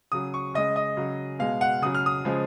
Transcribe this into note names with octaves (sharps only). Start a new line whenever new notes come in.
C#3 F#3 D#6
C#6
C#3 G#3 D#5
D#5
C#3 F#3
B2 G#3 F5
F#5
C#3 F#3 D#6
F6
D#6
C#3 F3 G#3